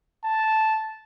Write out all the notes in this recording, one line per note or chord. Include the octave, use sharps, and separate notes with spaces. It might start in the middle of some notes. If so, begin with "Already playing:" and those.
A5